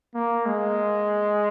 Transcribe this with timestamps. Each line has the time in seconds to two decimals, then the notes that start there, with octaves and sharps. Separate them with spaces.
0.14 A#3
0.46 G#3